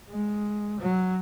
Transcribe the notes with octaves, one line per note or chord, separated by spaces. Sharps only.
G#3
F#3